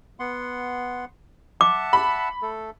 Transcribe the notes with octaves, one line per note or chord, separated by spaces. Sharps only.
B3 F#5 C6
E5 F#5 A5 D6
B5
A3 A4